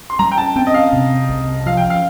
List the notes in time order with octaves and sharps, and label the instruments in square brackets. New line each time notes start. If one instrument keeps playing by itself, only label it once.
[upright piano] C6
[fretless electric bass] G3 [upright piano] A#5
[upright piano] G5
A5
[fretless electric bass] C4 [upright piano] G5
[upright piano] D#5
F5
[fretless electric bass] C3
C2
[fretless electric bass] F3 [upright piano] F5
[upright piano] G5
F5